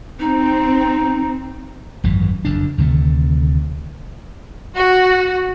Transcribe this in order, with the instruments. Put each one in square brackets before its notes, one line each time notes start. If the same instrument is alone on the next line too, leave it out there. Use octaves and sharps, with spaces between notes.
[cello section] C4 [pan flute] D#4
[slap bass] G#1 F#2 E3
F#1 F2 D4
D2 C3 D#3 A3
[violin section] F#4